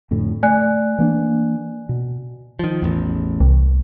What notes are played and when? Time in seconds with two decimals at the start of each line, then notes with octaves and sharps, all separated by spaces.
0.11 F2 A2 D3
0.43 A3 D5 G#5 F#6
0.99 E3 A#3 D4
1.89 B2
2.59 D#3 F3
2.82 A1 E2
3.40 C2